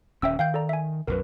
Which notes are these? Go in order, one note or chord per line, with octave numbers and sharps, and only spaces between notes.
D#1 C#4 E5 G5 E6
D#3 F5 G5 G6
A4 D5 A#5
E5 G#5
B1 F#2 B2 A#4 B4